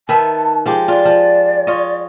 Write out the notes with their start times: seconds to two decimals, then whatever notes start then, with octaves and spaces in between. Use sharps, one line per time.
0.09 D#3 B4 E5 A5
0.66 F3 G#3 G4
0.88 F4 D5
1.05 F3
1.67 F4 C#5 D#5